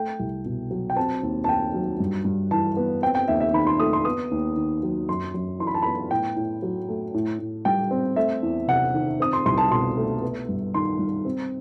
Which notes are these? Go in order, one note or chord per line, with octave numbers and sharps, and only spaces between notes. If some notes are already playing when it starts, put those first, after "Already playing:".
Already playing: A3 G5
C2
B2
F#3
G5
C4 A5
D#2
A5
D#3 G5
F#3
G2
G2
E3 A5
B3
C4 G5
G5
D#2 E5
E5
D#3 B5
C6
A3 D#6
C6
B3 D#6
D#2
D#3
F#3
F#2 C6
F#2
E3 C6
B5
A5
B3 B5
A2 G5
A2
F#3
A3
A2
A2
G3 G5
C4
A3 E5
E2
C3 F#5
D#3
C4 D#6
C6
C2 C6
A5
B2 C6
A3
B3
G2
D#3 C6
G3
C4